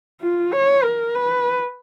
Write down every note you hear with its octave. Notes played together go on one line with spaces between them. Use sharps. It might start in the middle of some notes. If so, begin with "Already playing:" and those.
F4
C#5
A#4
B4